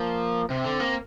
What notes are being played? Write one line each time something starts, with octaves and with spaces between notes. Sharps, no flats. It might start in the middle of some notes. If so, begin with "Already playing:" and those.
Already playing: F3 A#3
C3 C4
D3
A#3